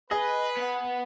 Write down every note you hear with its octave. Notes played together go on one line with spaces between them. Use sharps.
G#4 B4 D#5
B3 F#5